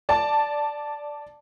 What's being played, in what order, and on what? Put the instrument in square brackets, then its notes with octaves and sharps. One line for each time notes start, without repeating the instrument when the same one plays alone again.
[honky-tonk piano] D5 A5